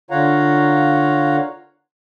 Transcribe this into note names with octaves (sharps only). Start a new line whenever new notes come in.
D3 F4 C#5 F5 F#5 A#5